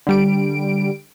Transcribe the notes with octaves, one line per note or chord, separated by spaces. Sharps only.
D3 G3 D7